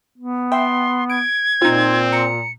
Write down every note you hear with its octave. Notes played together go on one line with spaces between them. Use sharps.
B3
E5 G5 C6
G#6 D7
A#2 C4 D#4 F4
A#5 C#7